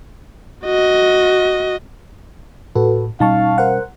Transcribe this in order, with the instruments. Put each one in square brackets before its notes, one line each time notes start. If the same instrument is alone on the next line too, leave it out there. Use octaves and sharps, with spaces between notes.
[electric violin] F#4 D#5
[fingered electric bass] A2 [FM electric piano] F#4 A4 B4
[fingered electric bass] B2 G3 C#4 [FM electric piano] D#4 A5 C#6 [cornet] F5
[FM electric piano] A#4 C5 F#5